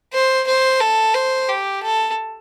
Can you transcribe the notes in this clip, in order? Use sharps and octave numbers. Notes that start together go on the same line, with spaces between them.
C5
C5
A4
C5
G4
A4